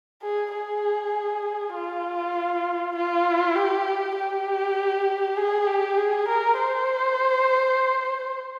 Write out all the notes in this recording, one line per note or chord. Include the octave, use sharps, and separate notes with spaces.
G#4
G#4
F4
F4
G4
G4
G#4
G4
G#4
A#4
C5